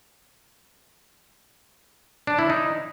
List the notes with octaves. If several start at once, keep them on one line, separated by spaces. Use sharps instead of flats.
D4
E4
D#4